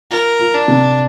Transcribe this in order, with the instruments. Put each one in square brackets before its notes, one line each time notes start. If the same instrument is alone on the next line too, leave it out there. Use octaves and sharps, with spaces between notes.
[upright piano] F4 [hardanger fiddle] A#4
[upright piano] F4
[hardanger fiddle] D4
[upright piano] C3